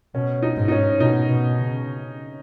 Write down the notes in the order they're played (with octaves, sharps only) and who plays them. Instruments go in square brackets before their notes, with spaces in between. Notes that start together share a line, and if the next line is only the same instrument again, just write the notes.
[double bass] B2 [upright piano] C#4
[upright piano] D#4
[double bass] G#2
[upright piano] D#4
C#4
[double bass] B2 [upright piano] D#4
[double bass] B2
C#3